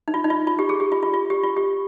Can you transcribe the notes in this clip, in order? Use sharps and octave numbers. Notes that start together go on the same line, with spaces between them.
D#4
F4
D#4
F4
F4
G4
G#4
G4
F4
F4
F4
G4
F4
G4